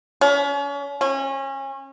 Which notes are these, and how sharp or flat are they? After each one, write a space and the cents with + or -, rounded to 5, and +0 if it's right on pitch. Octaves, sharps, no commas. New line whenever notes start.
C#4 +35
C#4 -30